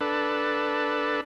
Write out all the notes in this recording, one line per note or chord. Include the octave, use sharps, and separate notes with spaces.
D4 A4 B4